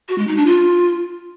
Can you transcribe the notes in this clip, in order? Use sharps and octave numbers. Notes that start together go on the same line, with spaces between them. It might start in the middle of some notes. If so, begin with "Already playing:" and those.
F#4
G#3
D#4
D4
F4